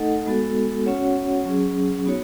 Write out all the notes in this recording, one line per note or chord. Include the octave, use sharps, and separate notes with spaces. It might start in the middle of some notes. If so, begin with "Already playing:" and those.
Already playing: A3 D#4 A4 D#5 F#5
G#3 B3 F#4 A4
C#4 F#4 C#5 F#5
F#3 C#4 G#4
B3 D#4 F#4 C#5